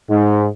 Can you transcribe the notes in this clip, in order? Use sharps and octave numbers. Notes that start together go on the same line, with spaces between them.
G#2